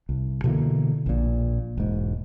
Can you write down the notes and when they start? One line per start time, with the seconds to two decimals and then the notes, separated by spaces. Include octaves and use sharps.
0.09 C2
0.44 B2 D3 E3 A#3
1.06 A#1 A#2
1.77 E1 G#2